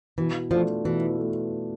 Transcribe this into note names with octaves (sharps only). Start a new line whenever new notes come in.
B2 E3
F3 A3 D4 F4
B2 E3
A3